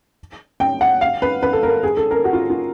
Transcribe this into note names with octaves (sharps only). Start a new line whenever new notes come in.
G5
F#5
F5
B4
B4
A4
A#4
G#4
A4
A#4
F#4
F4
F4